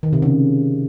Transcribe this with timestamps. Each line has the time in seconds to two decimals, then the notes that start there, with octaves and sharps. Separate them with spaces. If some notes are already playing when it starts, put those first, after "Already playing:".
0.03 D#3
0.13 C3
0.22 C#3